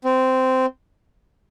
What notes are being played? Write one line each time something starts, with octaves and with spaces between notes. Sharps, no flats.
C4